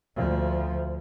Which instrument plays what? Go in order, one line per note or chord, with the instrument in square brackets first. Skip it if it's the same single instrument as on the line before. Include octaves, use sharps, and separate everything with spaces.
[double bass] D2 F3